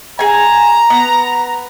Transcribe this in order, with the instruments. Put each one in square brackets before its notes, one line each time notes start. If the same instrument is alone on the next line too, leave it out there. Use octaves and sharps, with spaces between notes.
[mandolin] G#4 G#5 [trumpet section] A#5
[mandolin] B3